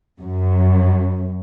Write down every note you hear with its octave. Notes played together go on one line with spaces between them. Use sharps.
F#2